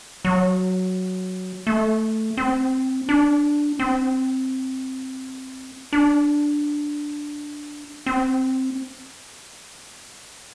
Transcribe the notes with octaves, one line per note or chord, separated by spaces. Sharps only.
F#3
A3
C4
D4
C4
D4
C4